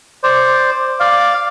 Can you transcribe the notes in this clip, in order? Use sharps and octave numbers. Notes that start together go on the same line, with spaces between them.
C5 D5
D5 F5